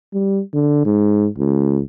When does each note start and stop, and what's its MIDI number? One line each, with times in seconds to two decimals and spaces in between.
0.13 0.41 55
0.54 0.84 50
0.85 1.28 44
1.38 1.81 37